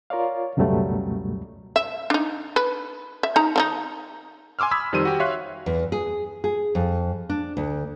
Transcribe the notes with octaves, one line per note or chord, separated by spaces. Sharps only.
F4 A#4 C#5 D5 F5
C#2 F#2 B2 F#3 G3 A3
E5
D4 D#4
B4
E5
D#4 A#5
D#3 D4 D#4
G#5 C6 D6 E6 F6
B5 D#6 E6 G#6 B6
F2 D#3 G3 C5 D#7
F#4 G4
C#5 E5 F5 C6 F#6
E2
G#4
G#4
F2
D4
D2